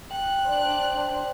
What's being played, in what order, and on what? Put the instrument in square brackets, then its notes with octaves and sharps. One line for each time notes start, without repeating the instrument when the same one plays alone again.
[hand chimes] G5 [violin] F#6
[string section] D4 [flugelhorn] C5